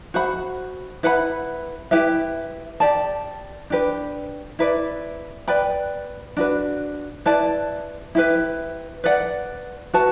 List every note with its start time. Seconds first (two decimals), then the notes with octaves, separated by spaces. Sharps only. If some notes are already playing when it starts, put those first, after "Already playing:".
0.14 F#4 C5 F#5 B5
1.03 E4 B4 F#5 B5
1.91 E4 G4 B4 E5
2.80 G4 D5 A5
3.70 D4 G4 B4
4.59 E4 B4 D5
5.48 B4 D5 G5 B5
6.37 D4 F#4 B4
7.25 E4 B4 D5 A5
8.15 E4 G4 B4
9.04 B4 D5 F#5
9.93 F#4 B4 F#5 A5